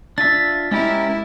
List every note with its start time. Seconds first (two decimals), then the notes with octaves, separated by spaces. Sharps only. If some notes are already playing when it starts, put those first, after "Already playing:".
0.18 D4 F4 E5 A6
0.72 G#3 C#4 E4 G4 A#4